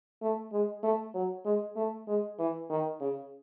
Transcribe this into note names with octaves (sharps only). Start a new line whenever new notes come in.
A3
G#3
A3
F#3
G#3
A3
G#3
E3
D#3
C#3